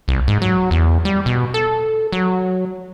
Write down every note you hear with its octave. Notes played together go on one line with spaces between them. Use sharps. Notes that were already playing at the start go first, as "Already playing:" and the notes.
C2
G#2
F#3
E2
G3
B2
A4
F#3